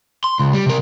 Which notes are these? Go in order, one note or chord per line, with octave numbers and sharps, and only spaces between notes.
C6
C#2
G3
C3 A#4